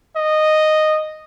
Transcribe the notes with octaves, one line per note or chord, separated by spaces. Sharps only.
D#5